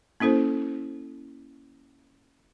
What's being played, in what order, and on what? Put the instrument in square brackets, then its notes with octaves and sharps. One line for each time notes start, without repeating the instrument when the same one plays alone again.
[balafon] A#3 C#4 E4 A4 C5